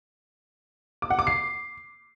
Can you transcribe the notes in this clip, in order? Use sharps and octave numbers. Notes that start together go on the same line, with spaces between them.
D6
F#5
D6
C7